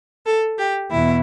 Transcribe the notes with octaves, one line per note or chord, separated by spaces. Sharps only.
A4
G4
E2 B2 E4